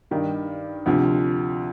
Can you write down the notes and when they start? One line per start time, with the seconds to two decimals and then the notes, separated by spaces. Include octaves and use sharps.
0.11 G2 D#3 G4
0.86 D2 C3 F3